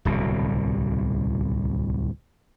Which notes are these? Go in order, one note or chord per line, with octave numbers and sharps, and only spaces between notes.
D1 C2 B2